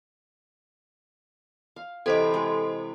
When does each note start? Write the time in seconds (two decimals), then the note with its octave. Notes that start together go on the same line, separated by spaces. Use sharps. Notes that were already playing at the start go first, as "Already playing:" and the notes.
1.76 F5
2.06 C3 E3 E4 A4 C5 D#5
2.34 G#3 G#4